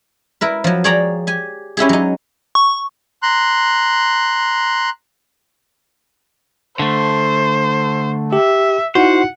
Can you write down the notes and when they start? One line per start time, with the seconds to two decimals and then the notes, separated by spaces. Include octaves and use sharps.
0.41 E4 A#4 B4
0.64 F3 F#3
0.84 G#4 C#5 D5 G5 A#5
1.27 G4 G#5
1.77 C#4 E4 G4 G#4
1.89 F#3 D#4
2.55 C#6
3.23 A#5 C6 F#6
6.79 D3 A3 C5
8.33 G4 E5
8.95 D#4 E4 F#4 C5 F#5